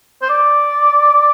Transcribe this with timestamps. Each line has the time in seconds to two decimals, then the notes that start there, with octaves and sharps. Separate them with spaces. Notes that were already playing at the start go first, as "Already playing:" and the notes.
0.22 C5
0.29 D5